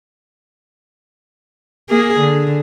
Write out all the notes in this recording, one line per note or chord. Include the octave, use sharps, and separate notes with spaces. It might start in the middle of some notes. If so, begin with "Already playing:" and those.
A#3 G#4
D3